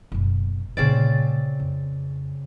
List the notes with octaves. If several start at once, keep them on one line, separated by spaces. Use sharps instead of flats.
F#1 B2
A#2 C#3 A3 C4 D5
F2